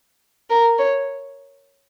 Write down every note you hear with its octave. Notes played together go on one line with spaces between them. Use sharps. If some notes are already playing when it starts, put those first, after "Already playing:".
A#4
C#5